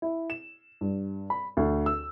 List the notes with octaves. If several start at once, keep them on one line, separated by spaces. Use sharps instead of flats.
E4
E7
G2
B5
D2
E6